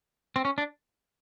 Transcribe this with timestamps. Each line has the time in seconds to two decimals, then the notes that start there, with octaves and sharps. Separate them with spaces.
0.36 C4
0.45 C#4
0.58 D4